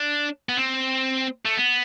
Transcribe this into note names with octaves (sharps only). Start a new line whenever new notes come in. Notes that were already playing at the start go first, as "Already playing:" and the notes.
Already playing: D4
B3
C4
A3
B3